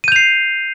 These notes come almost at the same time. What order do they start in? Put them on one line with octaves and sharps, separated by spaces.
D#7 G6 F7 C7